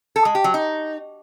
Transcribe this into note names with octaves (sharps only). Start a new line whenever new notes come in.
A4
G#3
G4
F#3
D#4